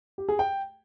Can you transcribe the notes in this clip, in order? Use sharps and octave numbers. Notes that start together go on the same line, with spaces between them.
G4
G#4
G5